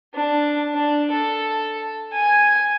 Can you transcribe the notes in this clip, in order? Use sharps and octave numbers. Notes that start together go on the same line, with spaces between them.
D4
D4
A4
G#5